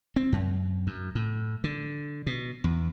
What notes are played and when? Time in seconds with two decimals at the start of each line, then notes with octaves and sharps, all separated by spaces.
0.16 C4
0.32 F#2
0.87 F#2
1.15 A2
1.64 D3
2.27 B2
2.64 E2